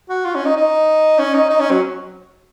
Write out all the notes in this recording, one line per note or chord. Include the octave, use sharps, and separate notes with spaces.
F#4
F4
C#4
D#4
D#4
C#4
D#4
D#4
C#4
F#3